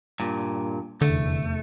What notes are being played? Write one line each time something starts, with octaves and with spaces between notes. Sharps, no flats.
G2 A#2
F1 E2 D3 A3